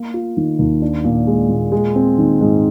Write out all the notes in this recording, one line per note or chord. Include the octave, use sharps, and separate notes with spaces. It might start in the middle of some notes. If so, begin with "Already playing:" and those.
Already playing: A#3
F4
D#3
D#2
D4
A#2
G#3
A#2
G#3
C4
D#3
G#2